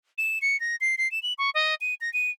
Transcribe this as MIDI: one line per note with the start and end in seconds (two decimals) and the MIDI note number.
0.18 0.39 100
0.42 0.59 97
0.60 0.76 94
0.81 0.95 96
0.98 1.10 96
1.11 1.22 100
1.23 1.33 102
1.38 1.50 85
1.54 1.75 75
1.81 1.94 99
2.01 2.12 94
2.13 2.31 99